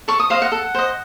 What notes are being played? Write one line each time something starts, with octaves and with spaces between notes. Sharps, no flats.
A4 C#6
D#6
C5 D#5 F5
F#5
A4
C5 D#5